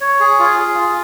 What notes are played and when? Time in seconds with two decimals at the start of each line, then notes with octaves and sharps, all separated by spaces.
0.01 C#5
0.20 G#4
0.39 F4
0.59 G#4
0.79 F4